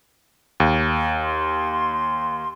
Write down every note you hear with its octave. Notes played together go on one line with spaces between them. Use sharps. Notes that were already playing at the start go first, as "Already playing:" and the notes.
D#2
C6